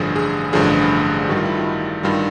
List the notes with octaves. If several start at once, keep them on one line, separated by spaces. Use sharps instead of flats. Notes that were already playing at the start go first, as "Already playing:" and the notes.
Already playing: A1 G2 D3 F3 G#4
G#4
A1 G2 D3 F3 G#4
A1 G2 D#3 G3 F#4
F4
E4
F4
G2 D#3 G3 F4